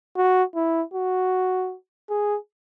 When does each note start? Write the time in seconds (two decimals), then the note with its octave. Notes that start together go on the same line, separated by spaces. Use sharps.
0.16 F#4
0.55 E4
0.94 F#4
2.09 G#4